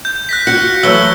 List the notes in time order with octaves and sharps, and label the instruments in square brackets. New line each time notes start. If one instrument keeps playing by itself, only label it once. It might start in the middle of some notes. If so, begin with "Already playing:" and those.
[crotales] G6
F#6 A#6 B6
[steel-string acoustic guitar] F4 F#4 [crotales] G6 C#7
[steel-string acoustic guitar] E3 F#3 A3 [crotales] E6 G7